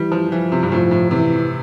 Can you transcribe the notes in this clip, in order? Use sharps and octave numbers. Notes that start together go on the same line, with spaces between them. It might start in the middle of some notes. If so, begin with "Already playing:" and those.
Already playing: E3 G3
F3
E3 F3
C3
G2
A2 F3
A2
C3 E3